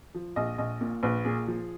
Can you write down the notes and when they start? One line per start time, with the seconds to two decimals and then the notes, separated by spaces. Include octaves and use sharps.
0.15 F3
0.36 A#1 D#5
0.58 A#1 D#5
0.81 A#2
1.03 A#1 B4
1.25 A#2 G#4
1.47 F3